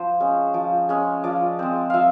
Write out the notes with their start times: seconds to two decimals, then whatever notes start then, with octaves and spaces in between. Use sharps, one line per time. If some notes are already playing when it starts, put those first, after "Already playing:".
Already playing: F3 C5
0.20 G#3 C#4
0.54 F3
0.89 G#3 C#4
1.24 F3 D5
1.59 G#3 C4
1.90 F3 E5 F5